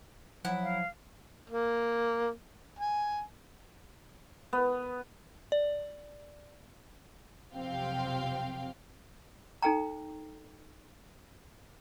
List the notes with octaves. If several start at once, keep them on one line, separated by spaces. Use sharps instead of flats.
F3 F#3 E4 F#5
F5
A#3
G#5
B3
D5
B1 F2 C3 C4 F5 G5
D#4 A4 G5 A#5